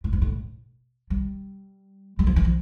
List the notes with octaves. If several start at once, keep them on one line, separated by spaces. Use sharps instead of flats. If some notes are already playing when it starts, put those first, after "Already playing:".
A2
G#2
A2
G3
G3
F3
E3
F3